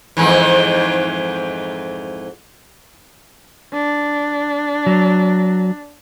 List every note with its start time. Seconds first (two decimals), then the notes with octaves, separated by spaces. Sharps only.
0.17 F2 G#2 E3
3.73 D4
4.86 F#3